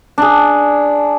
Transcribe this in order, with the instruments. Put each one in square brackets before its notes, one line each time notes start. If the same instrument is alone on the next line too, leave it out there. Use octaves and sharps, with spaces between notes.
[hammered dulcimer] D4 G#4